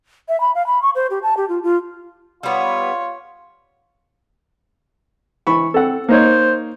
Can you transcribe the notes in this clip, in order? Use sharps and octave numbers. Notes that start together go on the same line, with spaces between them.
E5
B5
F5
B5
C#6
C5
G4
A5
G4
F4
F4
G3 B3 F4 C#5
E3 B5 C#6
C4 A4 F#5
A#3 D#4 C5 C#5